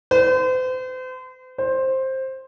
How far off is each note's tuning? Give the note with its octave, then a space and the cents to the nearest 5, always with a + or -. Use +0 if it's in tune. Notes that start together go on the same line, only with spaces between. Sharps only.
C5 -40
C5 +10